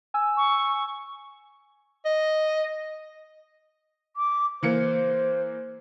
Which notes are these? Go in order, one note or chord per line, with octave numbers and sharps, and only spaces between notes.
G#5 E6
C#6
D#5
D6
E3 A#3 C5 C#7